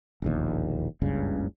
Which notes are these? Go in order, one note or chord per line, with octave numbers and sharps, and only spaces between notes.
E1 A#1 D#2
F#1 C#2 G2 C#3